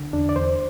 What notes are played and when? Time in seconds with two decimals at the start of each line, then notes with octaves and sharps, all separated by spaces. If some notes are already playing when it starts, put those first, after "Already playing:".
Already playing: D3
0.13 E2 D4
0.29 D5
0.36 E2 C5